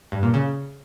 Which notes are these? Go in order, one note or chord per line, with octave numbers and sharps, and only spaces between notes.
G2
A#2
C#3